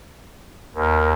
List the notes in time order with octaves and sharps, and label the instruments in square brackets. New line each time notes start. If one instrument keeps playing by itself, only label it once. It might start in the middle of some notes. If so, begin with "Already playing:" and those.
[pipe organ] D#2 [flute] A#4